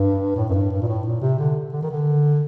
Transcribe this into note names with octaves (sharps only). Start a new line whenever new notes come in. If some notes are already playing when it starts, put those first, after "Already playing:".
Already playing: G2
A2
F#2
G2
G2
A#2
A2
A#2
C3
D3
D3
D#3
D3